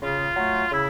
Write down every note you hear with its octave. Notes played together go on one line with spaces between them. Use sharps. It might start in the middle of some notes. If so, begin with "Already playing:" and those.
C#3 F4
F#3 A3
C#3 E4